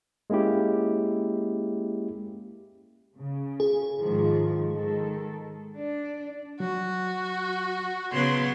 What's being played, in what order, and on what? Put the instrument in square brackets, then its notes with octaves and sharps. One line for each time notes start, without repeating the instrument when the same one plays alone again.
[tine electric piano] G#3 A#3 C#4 E4 G4
[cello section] C#3
[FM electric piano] G#4
[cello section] G#2 D#3 F3
D#3 G#3 A4
[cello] D4
[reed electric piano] F#3 [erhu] F#4
[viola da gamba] C#3 F#3 B3 [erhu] C6